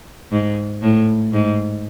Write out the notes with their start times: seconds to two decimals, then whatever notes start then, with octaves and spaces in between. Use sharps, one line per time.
0.32 G#2
0.82 A2
1.33 G#2